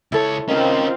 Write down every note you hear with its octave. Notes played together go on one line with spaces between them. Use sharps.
C#2 E4 A4 C#5
D#3 C4 C#4 F4 F5